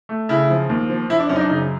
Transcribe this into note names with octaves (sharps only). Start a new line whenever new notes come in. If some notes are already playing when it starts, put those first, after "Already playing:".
A3
C#3 E4
F3
D#2
F3
F3 E4
D4
F#2 C#4
D#4
D4
C#3 D#4